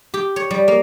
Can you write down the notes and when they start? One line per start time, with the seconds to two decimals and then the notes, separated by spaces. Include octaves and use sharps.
0.14 G4
0.36 C#5
0.51 G3
0.68 A#3